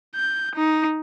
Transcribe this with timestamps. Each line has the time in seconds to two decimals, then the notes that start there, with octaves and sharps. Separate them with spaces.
0.15 G6
0.55 D#4